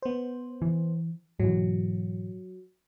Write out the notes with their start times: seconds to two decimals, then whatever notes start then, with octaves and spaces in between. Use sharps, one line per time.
0.02 B3 C5
0.62 E3
1.40 G#2 B2 E3 F#3